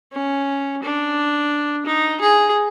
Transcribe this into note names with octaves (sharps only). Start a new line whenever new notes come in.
C#4
D4
D#4
G#4